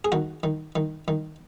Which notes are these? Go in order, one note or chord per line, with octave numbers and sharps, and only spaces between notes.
G#4
D#3 F#4
D#3
D#3
D#3